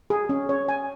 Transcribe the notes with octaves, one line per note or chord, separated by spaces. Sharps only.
G#4
C#4
C#5
G#5